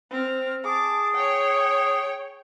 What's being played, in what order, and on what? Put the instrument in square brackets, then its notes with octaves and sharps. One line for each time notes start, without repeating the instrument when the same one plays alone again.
[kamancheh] C4 F6
[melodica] G#4 [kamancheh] A5 D6
[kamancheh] C#5 G5